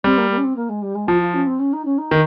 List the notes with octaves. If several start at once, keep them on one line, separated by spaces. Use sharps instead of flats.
G3 C4
A#3
A#3
C#4
C4
A#3
G#3
G3
G#3
F3 F4
F4
C#4
C4
C#4
D#4
C#4
D#4
D#3